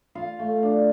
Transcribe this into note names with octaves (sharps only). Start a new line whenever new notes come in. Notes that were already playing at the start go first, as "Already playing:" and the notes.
F4 F5
A3
D4